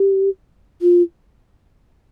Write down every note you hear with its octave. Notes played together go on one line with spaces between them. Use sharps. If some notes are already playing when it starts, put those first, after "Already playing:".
Already playing: G4
F4